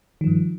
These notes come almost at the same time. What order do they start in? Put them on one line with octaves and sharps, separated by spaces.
D#3 F3 G2